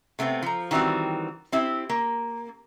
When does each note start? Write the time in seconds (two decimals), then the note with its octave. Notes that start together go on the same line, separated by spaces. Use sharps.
0.19 C3 A3 B3 C4
0.42 F3 A#5
0.71 D#3 E3 G3 C4 F#4
1.52 C4 E4 G4
1.90 A#3